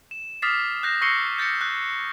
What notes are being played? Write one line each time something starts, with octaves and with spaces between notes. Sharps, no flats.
E7
D6 D#6 F6 A6 B6 C7
F#6 G6 A#6 C7
C#6 E6 A#6 C7 C#7 G7
G6 A6 A#6 C#7
F#6